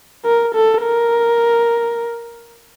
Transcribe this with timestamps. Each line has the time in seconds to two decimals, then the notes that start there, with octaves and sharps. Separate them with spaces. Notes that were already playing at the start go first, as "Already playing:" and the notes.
0.25 A#4
0.54 A4
0.83 A#4